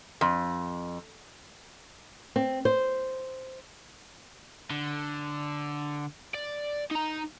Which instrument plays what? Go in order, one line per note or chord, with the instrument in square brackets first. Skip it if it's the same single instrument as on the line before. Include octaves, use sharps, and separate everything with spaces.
[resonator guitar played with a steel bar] F2
[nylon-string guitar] C4
C5
[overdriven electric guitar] D3
D5
D#4 A#5